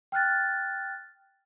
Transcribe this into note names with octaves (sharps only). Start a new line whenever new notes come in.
G5 F6 F#6 A6